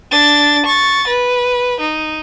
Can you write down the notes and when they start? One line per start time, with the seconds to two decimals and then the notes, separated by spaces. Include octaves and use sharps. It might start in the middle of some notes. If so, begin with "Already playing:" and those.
0.11 D4 A6
0.66 C#6 A6
1.08 B4
1.80 D#4